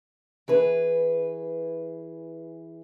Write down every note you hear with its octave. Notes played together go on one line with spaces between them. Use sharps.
E3 G#4 B4